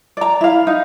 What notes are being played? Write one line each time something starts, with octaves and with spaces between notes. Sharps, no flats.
D5 A#5
E4 F5
D#4